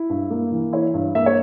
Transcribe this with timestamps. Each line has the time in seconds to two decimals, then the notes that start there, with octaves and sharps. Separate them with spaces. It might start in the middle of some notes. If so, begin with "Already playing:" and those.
Already playing: E4
0.10 G2
0.31 A#3
0.52 E3
0.73 E4 C#5
0.94 G2
1.15 A#3 E5
1.26 C#5